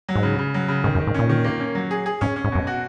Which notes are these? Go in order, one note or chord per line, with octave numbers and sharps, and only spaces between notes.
F#3
G#2
C#3
C#3
F#3
C#3
G#2 D#3
F#2
D#3
G#2
A#2 C#4
D#3
A#3
C#4
F#3
G#4
G#4
G#2 C#4
C#4
G#2
F#2 B2
F#4